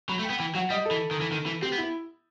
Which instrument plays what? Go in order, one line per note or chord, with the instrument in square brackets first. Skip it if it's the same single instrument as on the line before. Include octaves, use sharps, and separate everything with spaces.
[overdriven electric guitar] F#3 [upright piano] B5
[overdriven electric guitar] A3
[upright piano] G5
[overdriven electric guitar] B3
[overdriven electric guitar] E3 [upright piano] G5
[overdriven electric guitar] F#3 [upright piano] F#5
[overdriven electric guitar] G3 [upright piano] D#5
[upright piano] A4
[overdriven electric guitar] E3
D#3
E3
D#3
E3
[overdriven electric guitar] C4 [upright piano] G4
[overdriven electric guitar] B3
[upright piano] E4